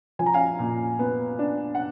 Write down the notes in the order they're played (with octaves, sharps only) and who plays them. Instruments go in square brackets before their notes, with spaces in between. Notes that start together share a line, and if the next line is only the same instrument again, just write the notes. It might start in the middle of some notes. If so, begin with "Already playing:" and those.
[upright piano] F3 G#5
A#5
F5 G#5
A#2
B3
D4
F#5